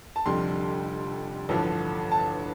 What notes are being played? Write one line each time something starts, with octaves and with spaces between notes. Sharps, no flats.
A5
F1 F2 D3 G3 C6
A1 G2 D3 F3
A5